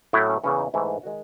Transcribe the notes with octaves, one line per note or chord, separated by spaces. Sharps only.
A2 F#3 A3 E4
C#4
E2 C#3 E3 C#4
D#4
G#2 E3 A3 E4
D#3 G#3 F#4